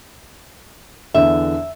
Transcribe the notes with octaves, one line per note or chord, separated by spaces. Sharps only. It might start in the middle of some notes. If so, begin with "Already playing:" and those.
E2 D3 E3 E5